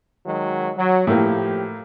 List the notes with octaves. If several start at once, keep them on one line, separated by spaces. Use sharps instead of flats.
D#3 F#3 G#3
F#3
A2 F3 A#3 G4